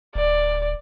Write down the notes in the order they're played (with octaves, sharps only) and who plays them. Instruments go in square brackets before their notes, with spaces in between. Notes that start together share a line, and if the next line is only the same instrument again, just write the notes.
[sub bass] D1 [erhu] D5